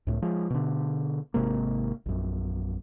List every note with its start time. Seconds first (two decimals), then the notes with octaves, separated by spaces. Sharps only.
0.07 C#2 A2
0.22 F3 G#3
0.50 B2 D3
1.34 G#1 C3 G#3 A#3
2.06 A#1 F#2